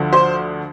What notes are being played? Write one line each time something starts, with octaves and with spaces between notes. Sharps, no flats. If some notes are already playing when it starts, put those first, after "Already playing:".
Already playing: D2 D3 F3
C5